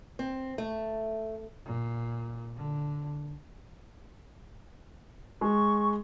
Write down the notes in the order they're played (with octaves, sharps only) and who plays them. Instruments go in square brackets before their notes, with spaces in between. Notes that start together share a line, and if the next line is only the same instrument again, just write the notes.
[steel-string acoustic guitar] C4
A3
[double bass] A#2
D3
[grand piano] G#3 [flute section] C#6